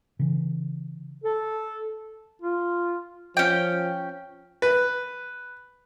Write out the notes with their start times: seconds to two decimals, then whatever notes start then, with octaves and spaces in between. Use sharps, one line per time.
0.19 C#3 E3
1.24 A4
2.42 F4
3.37 F3 C#4 G5
4.62 B4